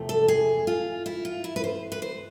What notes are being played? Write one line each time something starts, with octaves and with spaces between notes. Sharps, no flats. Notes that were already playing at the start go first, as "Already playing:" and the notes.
Already playing: E2 C3 F3 A3
A4
G#4
F4
E4
F4
E4
B4
C5
B4
C5